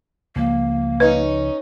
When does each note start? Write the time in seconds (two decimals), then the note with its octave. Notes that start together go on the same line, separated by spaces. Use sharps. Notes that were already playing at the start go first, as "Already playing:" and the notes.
0.36 C#2 F3 A#3
1.00 C#4 D#4 B4